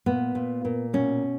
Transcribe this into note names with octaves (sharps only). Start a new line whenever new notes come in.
A#2 B3
A#2
A#2
B2 C#4